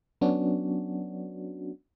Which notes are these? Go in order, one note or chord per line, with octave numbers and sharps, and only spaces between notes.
F#3 B3 C#4 D4 F#4